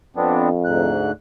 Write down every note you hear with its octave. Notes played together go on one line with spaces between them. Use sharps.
F2 B3 C4 D4
D2 G#2 F#6